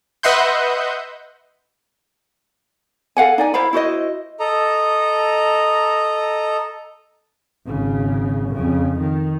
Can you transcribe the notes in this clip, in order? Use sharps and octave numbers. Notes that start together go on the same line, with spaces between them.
B4 D#5 E5 F#5 C6 G6
A4 F5 F#5 G#5
D#4 D5 G#5
E4 C5 F5 B5
E4 F#4 C5 D#5
A4 D#5 A#5
G#1 C#3
F2 C#3
D#3